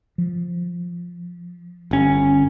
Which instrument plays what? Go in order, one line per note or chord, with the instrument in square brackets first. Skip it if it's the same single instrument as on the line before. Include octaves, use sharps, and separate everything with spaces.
[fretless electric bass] F3
[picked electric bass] G1 C#4